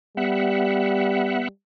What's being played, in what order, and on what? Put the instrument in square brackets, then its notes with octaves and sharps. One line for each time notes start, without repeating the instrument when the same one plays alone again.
[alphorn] G3 [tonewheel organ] B3 E5 F#5